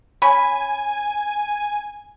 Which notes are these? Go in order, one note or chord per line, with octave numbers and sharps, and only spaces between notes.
C#4 G#5 B5